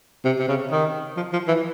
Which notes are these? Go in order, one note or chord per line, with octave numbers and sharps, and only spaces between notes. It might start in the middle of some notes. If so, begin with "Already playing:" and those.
C3
C3
C#3
D#3
F3
F3
E3